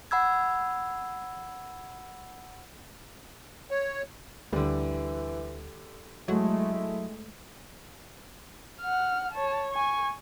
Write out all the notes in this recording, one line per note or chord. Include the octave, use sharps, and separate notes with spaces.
F#5 B5 E6 G#6
C#5
D2 D3 E3 G3
F#3 G#3 A3 E4
F#5 F6
C#5 A5
G#5 C#6